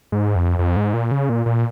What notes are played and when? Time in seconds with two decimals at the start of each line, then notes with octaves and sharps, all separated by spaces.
0.12 G#2
0.35 F2
0.59 F2
0.77 G#2
0.94 A#2
1.11 C#3
1.29 A#2
1.46 A#2